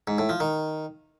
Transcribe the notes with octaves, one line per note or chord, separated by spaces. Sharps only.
G#2
A2
F3
D#3